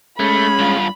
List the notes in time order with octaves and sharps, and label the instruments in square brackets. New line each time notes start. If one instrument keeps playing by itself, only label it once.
[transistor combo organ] G#3 C#4 [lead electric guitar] A3 [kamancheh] B5
[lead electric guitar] G2 F4